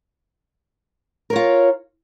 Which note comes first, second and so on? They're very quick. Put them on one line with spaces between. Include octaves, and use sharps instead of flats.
A#4 C#5 F4